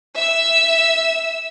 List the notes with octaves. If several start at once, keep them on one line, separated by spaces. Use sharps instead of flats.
E5 E6